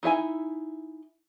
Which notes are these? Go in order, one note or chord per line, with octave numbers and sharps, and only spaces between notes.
D#4 E4 E5 G#5